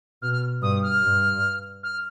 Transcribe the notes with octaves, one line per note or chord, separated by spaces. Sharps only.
B2 F6
F6
G2 D#6
F6
G2
F6